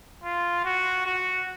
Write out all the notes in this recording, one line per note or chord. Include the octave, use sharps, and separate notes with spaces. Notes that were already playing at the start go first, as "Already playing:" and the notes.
F4
F#4
F#4